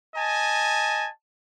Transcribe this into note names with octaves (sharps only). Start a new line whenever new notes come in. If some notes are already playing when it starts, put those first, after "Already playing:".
D#5 G#5 A5